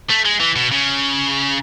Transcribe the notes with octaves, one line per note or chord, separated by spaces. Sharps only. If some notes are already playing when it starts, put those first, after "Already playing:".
A3
G#3
E3
B2
C#3